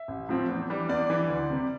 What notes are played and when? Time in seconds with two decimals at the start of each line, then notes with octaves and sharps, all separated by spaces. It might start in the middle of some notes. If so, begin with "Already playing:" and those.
Already playing: E5
0.08 A1
0.29 A2 F3 C4
0.48 E2
0.70 E3 G3 D4
0.89 E2 D5
1.10 E3 G3 D4
1.29 D2
1.50 C3 G3